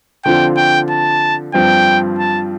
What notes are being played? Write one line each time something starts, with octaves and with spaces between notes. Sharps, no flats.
D3 F3 C4 F4 G5
G5
A5
G2 F3 C4 G5
A5